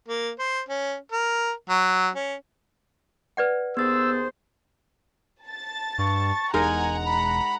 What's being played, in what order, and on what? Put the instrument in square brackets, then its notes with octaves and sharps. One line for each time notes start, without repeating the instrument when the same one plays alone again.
[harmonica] A#3
C5
C#4
A#4
F#3
C#4
[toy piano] B4 D5 F#5
[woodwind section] D#2 G#4 C5 [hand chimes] B3 A6 [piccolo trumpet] E6
[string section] A5 A6
[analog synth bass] G2 [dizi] C#6
[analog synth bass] E1 [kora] G#3 D#4 A#4 [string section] F#5 A#5 [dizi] G#5
[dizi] B5